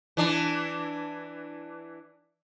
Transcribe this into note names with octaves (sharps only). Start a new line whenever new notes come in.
E3 D4